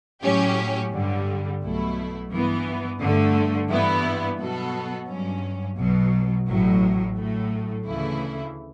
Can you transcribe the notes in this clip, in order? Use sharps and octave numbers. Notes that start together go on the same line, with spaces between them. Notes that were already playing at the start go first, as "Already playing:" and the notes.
A2 F#3 C#4 G4
G2 D3 G3
B1 B2 F#3 A3 E4
G2 E3 B3
G2 D3 A3
G2 E3 B3 E4
B2 F#3 B3 F#4 A4
G2 F#3 C#4
B1 B2 F#3
A1 A2 F#3
A2 F#3 A3
D2 C#3 E3 A3 E4